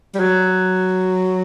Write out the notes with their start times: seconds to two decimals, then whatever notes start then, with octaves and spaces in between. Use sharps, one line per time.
0.15 G3
0.20 F#3